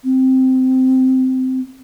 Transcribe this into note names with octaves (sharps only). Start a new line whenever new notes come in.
C4